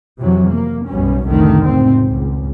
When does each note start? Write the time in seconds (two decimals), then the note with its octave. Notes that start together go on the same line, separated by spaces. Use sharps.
0.20 F2 C3 E3 F#3
0.52 A#3
0.88 B1 F#2 B2 G3 C#4
1.28 F1 C2 A2 D3 D#3 A3
1.63 C#2 A2 C4
2.08 C#2